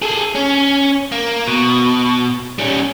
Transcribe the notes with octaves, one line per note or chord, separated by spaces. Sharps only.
G#4 A4
C#4
A#3
B2
G3 C#4